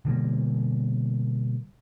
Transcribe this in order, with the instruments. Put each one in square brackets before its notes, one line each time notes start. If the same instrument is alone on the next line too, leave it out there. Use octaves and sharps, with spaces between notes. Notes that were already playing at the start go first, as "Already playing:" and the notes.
[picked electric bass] B2 D3 G3 A#3